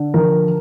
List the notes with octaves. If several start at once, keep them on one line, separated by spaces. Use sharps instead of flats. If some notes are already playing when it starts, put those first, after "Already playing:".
Already playing: D3
F3 A#4